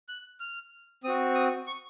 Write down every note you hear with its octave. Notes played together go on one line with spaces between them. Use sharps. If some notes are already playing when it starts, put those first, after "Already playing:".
F#6
F6
C4 F#4 D#6
D#6
C#6